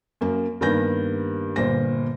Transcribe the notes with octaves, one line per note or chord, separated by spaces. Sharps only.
F#2 A#3
G2 D#3 A#3 B3 G6 A#6
G1 A#2 C5 A#6